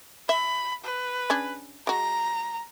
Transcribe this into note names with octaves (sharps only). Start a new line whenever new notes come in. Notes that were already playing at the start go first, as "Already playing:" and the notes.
E5 B5
B4
C#4 D4 G#4
G#3 F#4 A#5